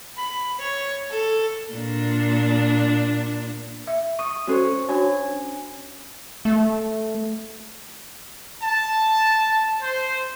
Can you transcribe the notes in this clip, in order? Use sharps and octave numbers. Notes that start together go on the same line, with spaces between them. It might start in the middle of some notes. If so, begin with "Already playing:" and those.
B5
C#5
A4
A#2 D4
E5
C#6 D#6
C#4 F#4 A4 C5 C#5
D4 F#4 C#5 G#5
A3
A5
C5